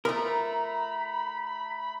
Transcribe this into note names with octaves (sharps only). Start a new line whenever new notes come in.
F3 A3 A#4 A#5 B5